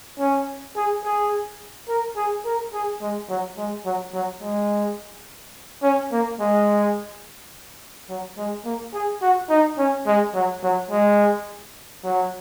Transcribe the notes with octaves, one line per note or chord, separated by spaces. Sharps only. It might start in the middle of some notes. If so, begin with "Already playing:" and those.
C#4
G#4
G#4
A#4
G#4
A#4
G#4
G#3
F#3
G#3
F#3
F#3
G#3
C#4
A#3
G#3
F#3
G#3
A#3
G#4
F#4
D#4
C#4
G#3
F#3
F#3
G#3
F#3